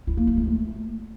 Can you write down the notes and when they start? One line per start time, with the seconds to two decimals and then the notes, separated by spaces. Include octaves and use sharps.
0.07 E4
0.17 A#3
0.27 E4
0.37 G#3
0.47 A3